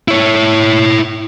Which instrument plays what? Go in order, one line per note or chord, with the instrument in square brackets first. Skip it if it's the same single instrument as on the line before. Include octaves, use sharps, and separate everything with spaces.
[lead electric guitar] E4 C#5